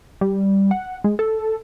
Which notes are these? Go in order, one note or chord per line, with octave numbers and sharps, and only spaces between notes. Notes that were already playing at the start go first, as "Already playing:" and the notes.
G3
F#5
G#3
A4